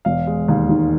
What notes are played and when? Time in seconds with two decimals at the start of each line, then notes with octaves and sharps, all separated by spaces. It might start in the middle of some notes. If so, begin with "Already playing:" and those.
0.05 E1 F5
0.27 G#3
0.48 D#2
0.69 D#3